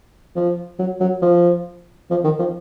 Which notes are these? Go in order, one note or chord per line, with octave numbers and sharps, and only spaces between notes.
F3
F#3
F#3
F3
F3
D#3
F3